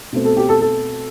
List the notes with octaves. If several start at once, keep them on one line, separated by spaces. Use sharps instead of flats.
B2 A3 C4
A4
G4
A4
A4